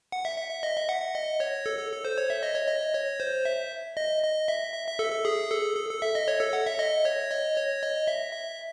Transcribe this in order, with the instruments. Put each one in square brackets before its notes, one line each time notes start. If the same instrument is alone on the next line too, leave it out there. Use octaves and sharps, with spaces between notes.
[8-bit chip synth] F#5
E5
E5
E5
D#5
E5
F#5
F#5
D#5
C#5
A4
A4
A4
C5
C#5
E5
D#5
C#5
D#5
C#5
C5
E5
D#5
D#5
E5
E5
E5
A4
A4
G#4
A4
A4
A4
E5
D#5
C#5
A4
F#5
E5
D#5
C#5
D#5
C#5
D#5
E5
E5